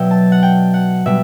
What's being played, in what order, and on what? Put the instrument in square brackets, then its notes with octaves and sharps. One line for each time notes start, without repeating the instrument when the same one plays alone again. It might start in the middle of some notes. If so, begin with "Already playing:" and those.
Already playing: [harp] B2 F#3 D5 E5 G5
A5
F#5
G5
F#5
B2 G3 E5